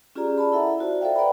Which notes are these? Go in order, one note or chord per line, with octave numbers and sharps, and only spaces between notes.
C#4 F4 G4 G#4 D5 A#5
D5 A5 B5
E4 A4 E5 F#5 A#5
F4 F#4 C5 D5
A4 C5 D5 E5 F5 G5
B4 D5 F#5 G5 A#5 B5